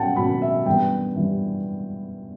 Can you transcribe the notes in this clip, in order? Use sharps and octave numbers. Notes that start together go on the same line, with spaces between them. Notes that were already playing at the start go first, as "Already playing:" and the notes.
Already playing: B2 F#3 C#4 F#5 G5 A5
B2 F#3 C#4 B5
E5
G2 E3 B3 G5
G2 E3 B3